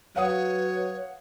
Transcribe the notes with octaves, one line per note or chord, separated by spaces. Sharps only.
F#3 B4 C#5 F5 F#5 D#6